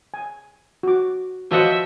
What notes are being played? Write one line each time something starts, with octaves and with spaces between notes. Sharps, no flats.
G#5
F#4 D6
F3 F#4 B4 C5 D#5 E5 F#5